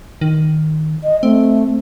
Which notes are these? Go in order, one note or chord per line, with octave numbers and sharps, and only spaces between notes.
D#3
D#5
A3 C4